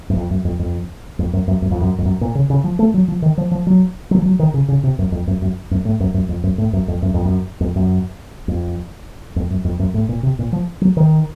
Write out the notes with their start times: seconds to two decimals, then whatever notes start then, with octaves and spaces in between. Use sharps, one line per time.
0.10 F#2
0.17 F2
0.31 F#2
0.45 F2
0.59 F2
1.19 F2
1.33 F#2
1.48 F#2
1.62 F#2
1.71 F2
1.81 F#2
1.98 F2
2.05 F#2
2.21 A#2
2.35 C#3
2.50 C#3
2.64 F3
2.79 A3
2.94 F#3
3.08 F3
3.22 D#3
3.37 F3
3.51 F3
3.67 F#3
4.11 F#3
4.19 F3
4.26 F#3
4.39 D#3
4.54 C#3
4.68 C#3
4.83 C3
4.99 F#2
5.12 F2
5.27 F#2
5.42 F#2
5.71 F#2
5.85 A2
6.00 F#2
6.14 F#2
6.29 F2
6.43 F#2
6.58 A2
6.73 F#2
6.88 F2
7.02 F#2
7.14 F2
7.25 F#2
7.61 F2
7.76 F#2
8.48 F2
9.36 F2
9.50 F#2
9.65 F2
9.79 F#2
9.94 A2
10.09 A#2
10.23 C3
10.39 A#2
10.52 F3
10.81 F#3
10.97 D#3